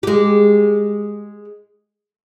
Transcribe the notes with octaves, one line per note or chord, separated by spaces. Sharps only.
G#3 G4